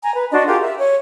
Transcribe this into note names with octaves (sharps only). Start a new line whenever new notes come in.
G#5 A#5
B4
D4 F#4 D#5 C6
F4 G4 G#4 A#4
E5
C#5